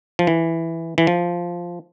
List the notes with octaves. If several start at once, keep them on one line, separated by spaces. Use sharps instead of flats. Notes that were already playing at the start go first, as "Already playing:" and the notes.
F3
E3
E3
F3